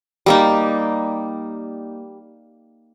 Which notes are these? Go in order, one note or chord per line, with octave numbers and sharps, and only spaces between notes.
G3 A#3 D#4